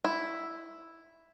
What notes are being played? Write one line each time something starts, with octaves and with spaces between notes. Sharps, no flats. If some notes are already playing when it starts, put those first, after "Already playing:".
E4